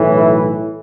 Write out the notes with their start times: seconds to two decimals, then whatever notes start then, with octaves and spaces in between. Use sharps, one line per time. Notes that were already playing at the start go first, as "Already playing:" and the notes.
Already playing: B1 A2 E3
0.16 E4